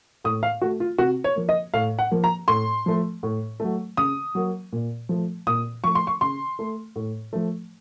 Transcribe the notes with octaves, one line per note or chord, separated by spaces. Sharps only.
A2 D#6
F5
A3 F#4
F4
C3 F#4
C#5
F3 A#3
D#5
A2 F5
F#5
F3 A#3
A#5
A2 C6
F3 A3
A2
F#3 A3
C#3 D#6
F#3 A#3
A#2
F3 A3
A#2 D#6
F3 A3 C#6
C6
C#6
C#3 C6
A3
A2
F3 A3